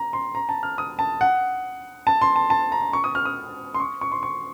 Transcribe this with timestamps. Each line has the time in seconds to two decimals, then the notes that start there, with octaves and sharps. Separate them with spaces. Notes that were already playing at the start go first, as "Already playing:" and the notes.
Already playing: A#5
0.13 C6
0.35 A#5
0.49 A5
0.63 F6
0.78 D#6
0.99 A5
1.21 F#5
2.07 A5
2.22 C6
2.36 A5
2.50 A5
2.72 A#5
2.93 C#6
3.04 D#6
3.15 F6
3.25 D#6
3.75 C6
3.80 C#6
4.01 C#6
4.12 C6
4.23 C#6